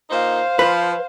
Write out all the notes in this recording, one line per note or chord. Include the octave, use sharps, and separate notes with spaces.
A#2 A#3 D#4 C5 F5
F3 B4